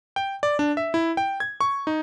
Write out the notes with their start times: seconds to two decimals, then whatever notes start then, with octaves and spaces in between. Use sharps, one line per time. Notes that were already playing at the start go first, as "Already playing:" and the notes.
0.16 G5
0.43 D5
0.59 D4
0.77 E5
0.94 E4
1.17 G5
1.40 G#6
1.61 C#6
1.87 D#4